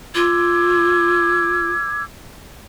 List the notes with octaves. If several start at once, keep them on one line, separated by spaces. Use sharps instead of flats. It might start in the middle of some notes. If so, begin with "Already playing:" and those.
F4 D6 E6 G#6